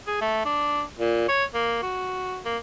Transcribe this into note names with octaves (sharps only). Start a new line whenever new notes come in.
G#4
A3
D4
A#2
C#5
A#3
F#4
A#3